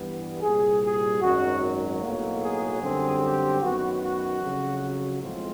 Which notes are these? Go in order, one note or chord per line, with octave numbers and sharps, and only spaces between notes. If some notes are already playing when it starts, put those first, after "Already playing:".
Already playing: G2 E3 G3 B3
C2 A#2 G3 G#4
G#4
G#1 F#2 D#3 F#3 F#4
B1 A2 F#3 A#3
G#4
F#2 D3 G3 C4
G4
F#2 D#3 F#3 B3 F#4
F#4
F2 C#3 F#3
F#4
B1 A2 F3 G#3 C4 F4